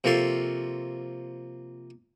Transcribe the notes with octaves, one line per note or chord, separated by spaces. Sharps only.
C3 F3 A#3 A4 C6 C#6